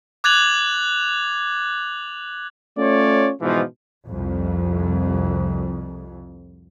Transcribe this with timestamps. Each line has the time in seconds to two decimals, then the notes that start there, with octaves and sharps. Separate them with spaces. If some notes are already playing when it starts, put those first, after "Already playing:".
0.24 D6 F#6 G#6 A6 F7 F#7
2.78 A3 C#4 F4 C#5 D5
3.42 G#2 B2 E3 F3
4.05 C2 F2